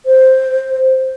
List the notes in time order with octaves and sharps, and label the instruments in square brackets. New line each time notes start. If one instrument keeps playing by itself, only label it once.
[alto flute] C5